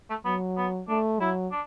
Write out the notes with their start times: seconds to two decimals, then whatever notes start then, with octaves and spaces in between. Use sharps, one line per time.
0.10 A3
0.25 F#3 B3
0.57 B3
0.88 A3 D4
1.20 F#3 E4
1.52 D4